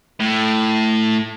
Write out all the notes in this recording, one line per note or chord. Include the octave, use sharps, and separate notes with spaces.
A2